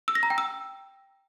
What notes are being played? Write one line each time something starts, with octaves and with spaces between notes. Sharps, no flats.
E6
A#6
A#5
G5
E6